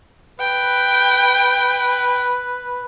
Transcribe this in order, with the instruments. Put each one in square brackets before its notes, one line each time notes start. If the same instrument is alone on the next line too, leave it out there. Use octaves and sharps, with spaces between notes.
[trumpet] B4 [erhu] G5